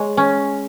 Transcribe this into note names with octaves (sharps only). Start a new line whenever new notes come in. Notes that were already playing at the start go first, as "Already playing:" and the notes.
Already playing: G#3 C#5
C#4